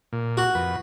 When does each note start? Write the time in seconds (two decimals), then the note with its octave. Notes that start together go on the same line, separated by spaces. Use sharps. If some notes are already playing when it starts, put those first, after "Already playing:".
0.13 A#2
0.37 F#4
0.55 F2 B4